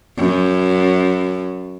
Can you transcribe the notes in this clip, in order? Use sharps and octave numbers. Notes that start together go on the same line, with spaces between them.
F#2